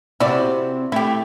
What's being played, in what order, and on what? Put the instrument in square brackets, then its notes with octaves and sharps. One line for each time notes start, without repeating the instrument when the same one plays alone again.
[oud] C3 C4 F#4 [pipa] E4 D5
[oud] A3 [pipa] E4 G4